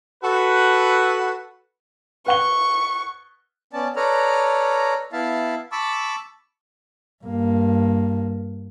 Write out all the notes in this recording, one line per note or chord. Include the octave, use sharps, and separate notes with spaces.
F#4 A4 B4
B4 F#5 C#6 G7
B3 C#4 D5 A5
A4 B4 C#5 D5 A#5 F6
B3 E4 E5 F5 A5
A5 B5 C#6 D6 E6
G2 A#3